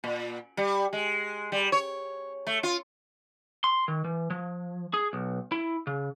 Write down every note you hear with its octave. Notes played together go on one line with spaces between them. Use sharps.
A#2
G3
G#3
G3
C#5
A3
F4
C6
D#3
E3
F3
G#4
B1
E4
C#3